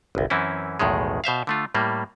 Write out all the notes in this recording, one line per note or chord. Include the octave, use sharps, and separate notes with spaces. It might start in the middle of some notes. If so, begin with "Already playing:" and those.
G1 C2
F#2 E3 C4 C#4 E4
B1 E2 A2 D#3 G#3
B2 C5 E5 F5
D3 A3 F4
A2 G3 A#3